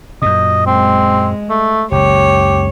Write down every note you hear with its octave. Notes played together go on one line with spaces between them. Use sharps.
F#2 A#2 D#5
G#3 C4
A3
F#1 C#2 G4 C#5